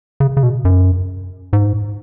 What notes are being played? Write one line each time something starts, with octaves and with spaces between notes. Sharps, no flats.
C#3
C#3
B2
F#2
G#2